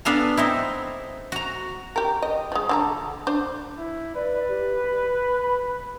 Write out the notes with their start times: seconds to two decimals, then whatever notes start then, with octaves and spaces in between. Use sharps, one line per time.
0.05 B3 D4 A4 F5 G#5 A#5
0.37 C4 D#4 E4
1.32 F#4 A#5
1.96 G4 A#4
2.22 D#5
2.52 F3 G#3
2.69 D3 A4 A#5
3.27 D4 C5
3.78 E4
4.15 B4 D5
4.49 G4
4.85 B5